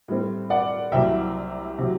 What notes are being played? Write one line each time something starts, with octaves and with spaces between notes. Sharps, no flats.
A2 G3 C4
D5 F#5
C2 C3 F#3 E5 G5
C3 F#3